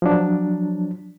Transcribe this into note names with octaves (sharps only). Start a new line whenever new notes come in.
F3 F#3 D4